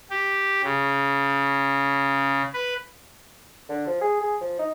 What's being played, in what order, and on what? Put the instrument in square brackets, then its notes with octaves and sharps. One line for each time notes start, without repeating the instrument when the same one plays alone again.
[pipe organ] G4
C#3
B4
[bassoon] D3
F3
G#4
G#4
F3
D#4